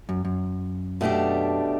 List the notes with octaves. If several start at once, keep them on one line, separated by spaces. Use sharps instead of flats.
F#2
F#2
B2 A3 D4 G4